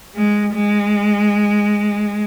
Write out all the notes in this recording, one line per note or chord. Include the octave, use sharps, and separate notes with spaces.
G#3
G#3